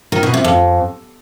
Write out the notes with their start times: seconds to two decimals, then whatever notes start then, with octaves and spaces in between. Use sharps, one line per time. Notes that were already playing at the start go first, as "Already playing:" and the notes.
0.12 D#3
0.23 B2
0.34 C3
0.44 F2